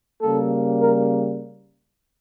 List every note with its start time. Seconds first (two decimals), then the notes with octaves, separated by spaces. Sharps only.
0.21 C#3 G3 A#3 A4
0.82 A#4